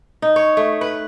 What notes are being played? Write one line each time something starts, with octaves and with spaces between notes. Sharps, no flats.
D#4
C#5
A3
B4